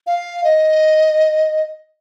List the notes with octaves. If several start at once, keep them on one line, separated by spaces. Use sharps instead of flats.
F5
D#5